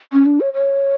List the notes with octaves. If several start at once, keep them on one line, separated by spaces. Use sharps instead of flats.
C#4
D4
C#5
C#5